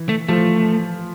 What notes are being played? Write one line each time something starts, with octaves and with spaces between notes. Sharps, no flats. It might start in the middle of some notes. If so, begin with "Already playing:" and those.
Already playing: E3
A3
F3 A3